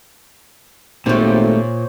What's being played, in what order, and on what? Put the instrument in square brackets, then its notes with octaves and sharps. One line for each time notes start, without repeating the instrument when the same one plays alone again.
[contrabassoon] G#1 [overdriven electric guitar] A#2 [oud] G3 A3 [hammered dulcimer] C5 C#5